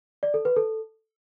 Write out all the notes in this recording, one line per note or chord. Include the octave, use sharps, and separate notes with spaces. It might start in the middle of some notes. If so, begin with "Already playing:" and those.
D5
A4
B4
A4